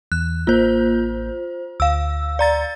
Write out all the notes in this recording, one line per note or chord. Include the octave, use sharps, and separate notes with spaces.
E2 F#6
A1 A#3 F4 C5 G6
D2 F5 E6
D5 A#5 A6